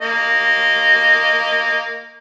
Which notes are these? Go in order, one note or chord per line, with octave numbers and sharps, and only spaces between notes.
A#3 D#5